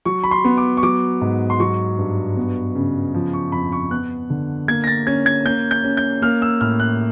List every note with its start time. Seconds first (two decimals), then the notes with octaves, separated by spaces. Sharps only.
0.05 F#3 C#6
0.24 B5
0.31 C6
0.45 B3
0.57 D6
0.77 C#6
0.83 F#3 D6
1.21 G#2
1.50 C6
1.60 F#3 C#6
1.98 G2
2.37 B3
2.75 C#3
3.14 F3
3.33 C#6
3.52 F2 B5
3.72 C#6
3.91 B3 F#6
4.30 D3
4.68 A#3 G#6
4.84 A#6
4.87 A6
5.07 C#4 G#6
5.26 G#6
5.45 A#3 G6
5.71 G6
5.84 C#4
5.97 G6
6.22 A#3 F6
6.42 E6
6.61 A2 F6
6.80 F#6